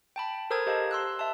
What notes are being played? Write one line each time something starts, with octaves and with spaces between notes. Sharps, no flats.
G5 A5 B5
A4 A#4 C5 A#5 D#6 G#6
G4 C5 D#5 F5 A5
C6 E6 F#6
E5 A5